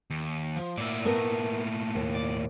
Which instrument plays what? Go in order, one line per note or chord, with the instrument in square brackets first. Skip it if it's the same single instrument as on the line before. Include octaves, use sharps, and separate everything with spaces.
[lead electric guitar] D#2
[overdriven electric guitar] F3
[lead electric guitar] A2 A#3 [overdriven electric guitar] D5 E5
[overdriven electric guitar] A3 [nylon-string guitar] B3 A#4
[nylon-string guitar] D#2
[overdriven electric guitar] D5